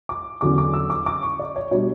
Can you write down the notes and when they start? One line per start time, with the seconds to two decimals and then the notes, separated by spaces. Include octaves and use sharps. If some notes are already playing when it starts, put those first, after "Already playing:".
0.09 D6
0.41 E2 D3 F#3 C#4 D6
0.58 D6
0.74 E6
0.90 D6
1.06 D6
1.23 C#6
1.39 D5
1.56 C#5
1.71 B2 G3 D4 C#5